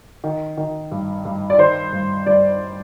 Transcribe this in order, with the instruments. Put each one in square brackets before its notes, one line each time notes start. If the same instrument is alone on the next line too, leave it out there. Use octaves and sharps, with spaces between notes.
[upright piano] D#3
D#3
G2
G2
D5
D#3 C5
G2
G2 D5